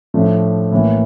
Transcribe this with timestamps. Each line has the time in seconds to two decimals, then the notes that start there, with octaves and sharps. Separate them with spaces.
0.14 A2 F3 A3 D4
0.71 A2 E3 A#3